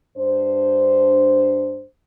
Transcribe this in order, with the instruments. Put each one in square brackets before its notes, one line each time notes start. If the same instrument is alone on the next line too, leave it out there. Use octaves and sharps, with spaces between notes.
[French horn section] G2 D4 C5